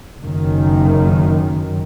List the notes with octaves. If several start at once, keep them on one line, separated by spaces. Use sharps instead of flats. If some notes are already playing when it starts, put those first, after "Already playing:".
F#1 F#2 D#3